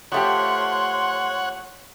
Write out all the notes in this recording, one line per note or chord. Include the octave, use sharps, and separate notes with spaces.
F3 A3 G4 C#5 F#5 C6